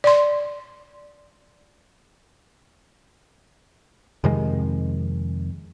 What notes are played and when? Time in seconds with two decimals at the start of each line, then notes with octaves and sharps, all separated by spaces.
0.04 D5 C6
4.24 F2 C3 D#3 G#3